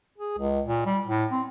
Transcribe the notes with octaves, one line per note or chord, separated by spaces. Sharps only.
G#4
C#2
A#2
G3
A2
C4